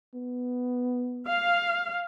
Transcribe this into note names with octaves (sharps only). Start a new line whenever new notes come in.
B3
F5